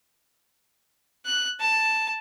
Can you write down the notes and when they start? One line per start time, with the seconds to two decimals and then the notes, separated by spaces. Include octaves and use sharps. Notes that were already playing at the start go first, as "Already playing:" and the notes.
1.26 F#6
1.60 A5